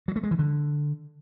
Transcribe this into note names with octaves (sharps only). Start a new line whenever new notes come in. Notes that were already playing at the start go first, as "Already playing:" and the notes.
F#3
A3
G#3
E3
D3